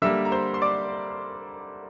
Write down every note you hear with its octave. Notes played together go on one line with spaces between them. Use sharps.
D3 G3 A#3 E5 E6
A#5
C5 C6
C6
D5 D6